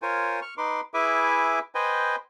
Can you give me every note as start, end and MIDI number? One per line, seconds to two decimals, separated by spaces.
0.02 0.40 65
0.02 0.40 70
0.02 0.40 72
0.02 0.40 73
0.02 0.40 80
0.42 0.54 85
0.42 0.54 89
0.58 0.81 63
0.58 0.81 71
0.58 0.81 84
0.58 0.81 86
0.94 1.59 64
0.94 1.59 68
0.94 1.59 71
0.94 1.59 76
0.94 1.59 80
0.94 1.59 86
1.75 2.16 71
1.75 2.16 72
1.75 2.16 75
1.75 2.16 79
1.75 2.16 80